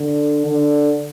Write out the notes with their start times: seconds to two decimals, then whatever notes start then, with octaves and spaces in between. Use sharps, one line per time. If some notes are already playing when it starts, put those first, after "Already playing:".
Already playing: D3
0.46 D3